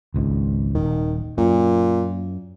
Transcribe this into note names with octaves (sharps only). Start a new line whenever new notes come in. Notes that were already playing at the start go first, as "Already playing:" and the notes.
G#1 C#2 G#2
D#1 D#3
F#2 A#2